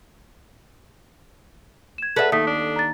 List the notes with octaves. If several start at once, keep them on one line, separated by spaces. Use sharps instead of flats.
G#6 E7
G#4 A4 B4 D5 E5 F#5
D#2 A3 A4 D#6 B6
D4
A#5 A6